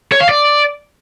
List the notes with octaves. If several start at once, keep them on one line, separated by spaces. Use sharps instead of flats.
C#5
F5
D5